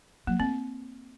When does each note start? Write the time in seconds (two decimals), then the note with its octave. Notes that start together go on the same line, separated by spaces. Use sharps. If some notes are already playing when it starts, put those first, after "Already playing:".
0.27 F#3 A#3
0.39 A3 C4